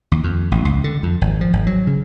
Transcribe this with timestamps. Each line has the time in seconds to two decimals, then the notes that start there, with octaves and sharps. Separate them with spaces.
0.12 D#2
0.24 F2
0.51 A1
0.65 C#2
0.84 D3
1.03 F2
1.21 G#1
1.41 F3
1.53 G#1
1.67 F#3
1.87 C#3